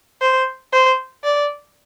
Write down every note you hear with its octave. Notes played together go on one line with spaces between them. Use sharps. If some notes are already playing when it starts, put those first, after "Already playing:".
C5
C5
D5